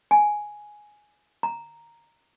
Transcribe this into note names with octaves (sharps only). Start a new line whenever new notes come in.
G#5
A#5